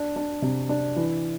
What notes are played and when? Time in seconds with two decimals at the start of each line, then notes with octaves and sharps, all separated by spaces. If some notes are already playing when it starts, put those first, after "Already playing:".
Already playing: D4
0.16 D4
0.42 C3
0.69 D4
0.96 E3